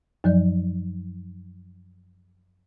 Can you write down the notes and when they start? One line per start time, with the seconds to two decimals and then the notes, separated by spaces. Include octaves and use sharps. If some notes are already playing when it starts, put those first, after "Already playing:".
0.24 F#2 F3 F#3 D5